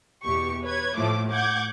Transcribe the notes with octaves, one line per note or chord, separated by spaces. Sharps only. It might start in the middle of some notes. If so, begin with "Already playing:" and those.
E2 B2 G4 C#6
B4 C#5 G#6
A2 F3 A3 D6
F#5 D6 G6 G#6